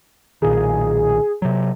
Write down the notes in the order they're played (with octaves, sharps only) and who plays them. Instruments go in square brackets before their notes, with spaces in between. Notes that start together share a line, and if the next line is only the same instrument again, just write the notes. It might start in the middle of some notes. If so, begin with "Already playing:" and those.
[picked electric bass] B1 A#2 D#3 [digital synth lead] G#4
[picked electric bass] C3 F#3